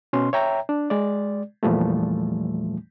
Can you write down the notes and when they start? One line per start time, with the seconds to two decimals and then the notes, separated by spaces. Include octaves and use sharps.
0.13 B2 C#4 C6
0.33 C#5 E5 G5 A#5
0.69 D4
0.90 G#3 D5
1.63 E2 A#2 E3 F3 G3 A3